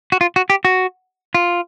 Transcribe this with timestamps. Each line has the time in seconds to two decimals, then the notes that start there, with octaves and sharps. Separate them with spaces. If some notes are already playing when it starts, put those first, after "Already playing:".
0.12 F#4
0.21 F4
0.36 F#4
0.50 G4
0.65 F#4
1.35 F4